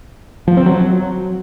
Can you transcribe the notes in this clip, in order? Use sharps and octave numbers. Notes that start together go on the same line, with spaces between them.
F3
C4
F#3